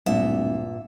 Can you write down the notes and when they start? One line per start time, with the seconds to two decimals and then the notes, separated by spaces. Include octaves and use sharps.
0.06 D1 G2 A#2 G3 E5